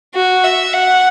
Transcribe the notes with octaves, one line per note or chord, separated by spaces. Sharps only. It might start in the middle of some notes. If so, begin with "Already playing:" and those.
F#4
E5
F#5